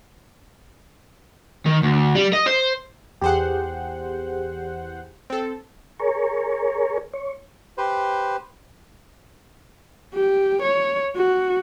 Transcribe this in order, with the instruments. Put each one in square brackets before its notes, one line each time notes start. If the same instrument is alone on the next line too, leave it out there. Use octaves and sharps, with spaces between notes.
[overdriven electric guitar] D#3
D2
G3
D#5
C5
[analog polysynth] E2 C5 F#5 [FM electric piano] G4 G#4
[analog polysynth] C4 A4
[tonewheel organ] G#4 A#4 C#5
C#5
[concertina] G4 B4 C5
[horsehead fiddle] G4
C#5
F#4